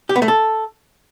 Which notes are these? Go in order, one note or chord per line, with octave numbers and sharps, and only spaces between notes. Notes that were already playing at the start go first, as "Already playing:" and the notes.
G4
B3
A3
A4